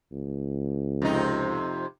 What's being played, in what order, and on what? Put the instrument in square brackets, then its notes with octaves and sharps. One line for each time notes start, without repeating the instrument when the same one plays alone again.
[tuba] C#2
[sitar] F2 C3 D#4